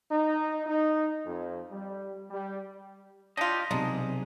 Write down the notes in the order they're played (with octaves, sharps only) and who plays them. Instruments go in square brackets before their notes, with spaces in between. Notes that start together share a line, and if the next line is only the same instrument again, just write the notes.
[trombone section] D#4
D#4
F2
G3
G3
[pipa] D4 F4 [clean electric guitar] G4 D#5
[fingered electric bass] B1 C3 [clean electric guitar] G#3 [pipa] D4 D#4